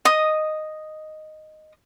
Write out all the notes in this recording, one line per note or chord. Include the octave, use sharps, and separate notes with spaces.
D#5 D#6